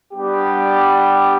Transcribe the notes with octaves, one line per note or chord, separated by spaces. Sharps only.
G3 B3 D4 G4